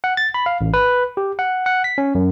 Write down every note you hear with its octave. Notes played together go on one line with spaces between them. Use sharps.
F#5
A6
B5
F5
A1
B4
G4
F#5
F#5
B6
C#4
F#2